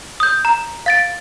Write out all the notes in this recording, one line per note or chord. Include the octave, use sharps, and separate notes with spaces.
D#6 G6
A#5
F5 A6 D7